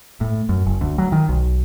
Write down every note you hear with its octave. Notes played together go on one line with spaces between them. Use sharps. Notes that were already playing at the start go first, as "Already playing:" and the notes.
A2
F#2
F#1
D2
F#3
D#3
B1